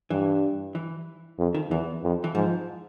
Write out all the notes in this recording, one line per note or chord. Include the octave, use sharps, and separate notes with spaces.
G2 E3
E3
F2
D#3
E2 E3
F2
E3
G#2 F3